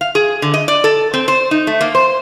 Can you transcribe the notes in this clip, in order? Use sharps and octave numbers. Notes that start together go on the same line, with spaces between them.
F5
G#4
D3
D#5
D5
A4
C4
C5
D#4
A3
A#3
C5